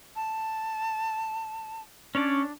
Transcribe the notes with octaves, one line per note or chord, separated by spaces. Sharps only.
A5
C#4 D4 C#5 D5